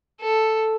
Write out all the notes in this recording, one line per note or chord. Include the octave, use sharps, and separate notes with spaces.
A4